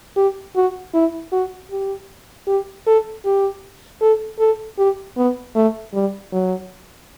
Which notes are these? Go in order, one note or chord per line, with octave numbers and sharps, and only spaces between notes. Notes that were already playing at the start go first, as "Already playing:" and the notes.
G4
F#4
E4
F#4
G4
G4
A4
G4
A4
A4
G4
B3
A3
G3
F#3